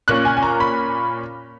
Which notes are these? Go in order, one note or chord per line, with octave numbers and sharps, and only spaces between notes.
A#2 A#3 C#4 F#6
G#5
G#5
A#5
B5